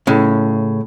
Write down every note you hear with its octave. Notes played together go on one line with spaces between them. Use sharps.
A2 C#3